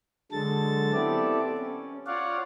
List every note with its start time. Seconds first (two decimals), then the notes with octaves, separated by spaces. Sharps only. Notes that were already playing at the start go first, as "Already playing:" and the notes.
0.32 D3 F#3 G#3 A4 A6
0.93 B3 C4 E4 G4 A4 D5
1.58 C#4
2.07 F4 C#5 D5 F5 F#5